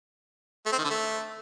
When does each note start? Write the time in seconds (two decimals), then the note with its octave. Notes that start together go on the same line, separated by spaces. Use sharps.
0.66 A3
0.72 C4
0.78 D#3
0.84 D3
0.90 A3